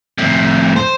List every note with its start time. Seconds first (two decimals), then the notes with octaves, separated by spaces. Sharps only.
0.18 F2 A2
0.77 C5